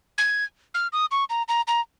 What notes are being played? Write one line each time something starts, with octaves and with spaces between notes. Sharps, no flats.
G#6
F6
D#6
C#6
A#5
A#5
A#5